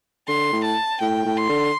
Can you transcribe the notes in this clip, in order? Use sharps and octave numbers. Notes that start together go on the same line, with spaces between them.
D3 C6
A2
A5
A2 G5
A2
C6
D3